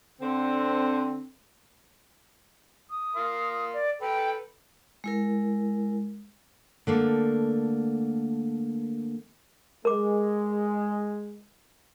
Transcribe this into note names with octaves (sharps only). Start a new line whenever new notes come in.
D3 C4
D#6
A#4 F5 C6
D5
A4 B4 G5
G#3 E4 A#4
D3 A3 A#3
G#3 A#4 D6